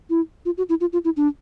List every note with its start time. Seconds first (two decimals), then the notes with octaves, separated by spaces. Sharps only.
0.10 E4
0.45 F4
0.57 F#4
0.69 E4
0.81 F4
0.93 F4
1.04 E4
1.17 D4